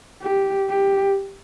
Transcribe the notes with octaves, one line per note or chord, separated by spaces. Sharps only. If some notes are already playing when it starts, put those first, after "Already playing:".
G4
G4